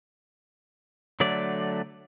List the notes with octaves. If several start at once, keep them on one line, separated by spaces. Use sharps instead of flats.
D3 F#3 A3 D5